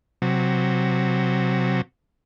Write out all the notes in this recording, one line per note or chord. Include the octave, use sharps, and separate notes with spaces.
C3 F#3